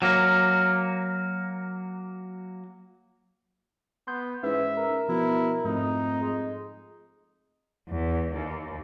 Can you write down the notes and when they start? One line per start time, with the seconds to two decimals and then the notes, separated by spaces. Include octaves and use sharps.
0.02 F#3 A#3
4.07 B3 C6 G6
4.43 G#2 E3 C#4 E5
4.77 A#4
5.09 B2 F3 E4
5.65 F2 G#2 A3 D#4
6.22 G#3
7.89 E2
8.32 D#2